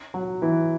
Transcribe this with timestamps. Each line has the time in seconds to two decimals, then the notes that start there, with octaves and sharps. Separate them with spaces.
0.14 F#3
0.42 E3